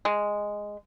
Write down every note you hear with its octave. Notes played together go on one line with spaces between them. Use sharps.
G#3